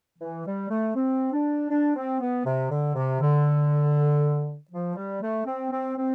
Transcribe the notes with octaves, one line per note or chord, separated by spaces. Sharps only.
E3
G3
A3
C4
D4
D4
C4
B3
C3
D3
C3
D3
F3
G3
A3
C4
C4
C4